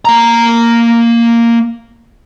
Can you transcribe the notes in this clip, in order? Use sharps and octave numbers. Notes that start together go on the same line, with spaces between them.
A#3 A#5